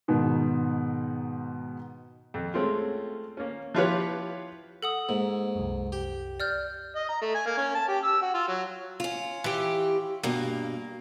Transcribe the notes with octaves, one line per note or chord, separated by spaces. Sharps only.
G#2 B2 D#3
F2
G#3 A3 C4 C#4 F4
A#3 C#4
F3 E4 F4 G4 B4 C#5
A4 F#5 D#6
G#2 A#3
C2 F#2
G4
D5 F6 G6
D#5
A#5
A3
G#5
A#3
C#4
A5
G4
E6
F#4
F4
F#3
C#4 F4
E3 G4
G2 B2 A#3